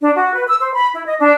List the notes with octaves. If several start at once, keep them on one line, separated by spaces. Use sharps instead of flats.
D4
F#4
B4
E6
C5
B5
E4
D#5
D4